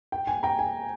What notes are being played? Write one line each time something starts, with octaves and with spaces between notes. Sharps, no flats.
G5
G#5
G5 A#5
G#5